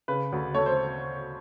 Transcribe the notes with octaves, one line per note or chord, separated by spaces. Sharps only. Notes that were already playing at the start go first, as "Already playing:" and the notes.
C#3 B4
D2
A3 C#5
C5